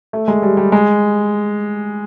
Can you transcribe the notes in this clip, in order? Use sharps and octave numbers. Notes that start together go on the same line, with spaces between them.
A3
G#3
G3
G3
G#3